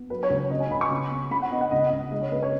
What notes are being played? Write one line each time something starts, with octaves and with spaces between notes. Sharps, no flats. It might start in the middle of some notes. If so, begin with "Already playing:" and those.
Already playing: B3
F#3 B4
C#5
C#2
C#5
C#3 D#5
G#5
C#2 B5
C#6
C#3
B3
C#3 B5
F#5
B3 D#5
F#5
C#2 D#5
C#2 D#5
G#3 D#5
C#5
C#3 B4
C#5